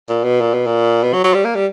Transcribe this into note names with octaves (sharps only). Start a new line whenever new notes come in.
A#2
B2
A#2
B2
A#2
B2
F#3
F#3
G3
A#3
G3